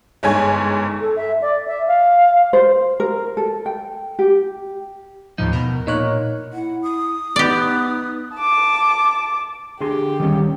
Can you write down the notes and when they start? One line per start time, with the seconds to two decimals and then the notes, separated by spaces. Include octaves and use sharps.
0.23 G1 G#2 C#5 G#5
1.01 A4
1.16 E5
1.41 D5
1.67 E5
1.88 F5
2.53 C5
3.00 A#4
3.37 A4
3.66 G5
4.19 G4
5.38 D#2 A2 F3 D#4
5.53 B2 A#4
5.87 A#2 D#4 C#5 F#6
6.53 E4 F#5
6.83 D#6
7.36 B3 D#4 G4 D5
8.36 A5 D6
9.81 D3 G4 G#4 C6
10.20 D#3 G3 C#4